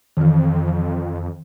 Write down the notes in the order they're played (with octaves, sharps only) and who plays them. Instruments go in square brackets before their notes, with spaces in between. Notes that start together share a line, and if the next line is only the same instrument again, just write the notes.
[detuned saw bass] F2 [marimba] D#3 E3